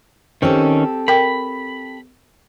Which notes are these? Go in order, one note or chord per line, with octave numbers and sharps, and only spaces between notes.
D#3 C4 C#4 G4 A4
A#4 G5 B5